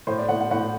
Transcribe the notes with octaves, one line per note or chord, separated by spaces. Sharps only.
A2 C5
D5
A2 F#5
F#5
A2 F#5